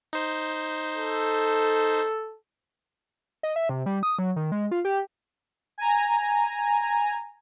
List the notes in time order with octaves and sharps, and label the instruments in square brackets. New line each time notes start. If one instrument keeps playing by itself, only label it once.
[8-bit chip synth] D#4 C5
[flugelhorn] A4
[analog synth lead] D#5
E5
C3
G3
D#6
F#3
D#3
G#3
F4
G4
[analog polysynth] G#5 A#5